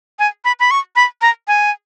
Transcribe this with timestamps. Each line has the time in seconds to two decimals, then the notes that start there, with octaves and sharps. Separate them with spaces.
0.19 G#5
0.45 B5
0.60 B5
0.71 C#6
0.96 B5
1.22 A#5
1.48 G#5